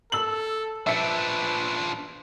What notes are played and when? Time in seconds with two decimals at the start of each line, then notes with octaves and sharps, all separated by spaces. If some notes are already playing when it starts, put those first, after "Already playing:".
0.12 A4 E6 F#7
0.87 F3 D4 B4 E5 C#7